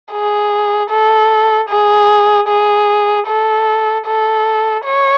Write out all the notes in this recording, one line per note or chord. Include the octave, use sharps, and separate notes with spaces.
G#4
A4
G#4
G#4
A4
A4
C#5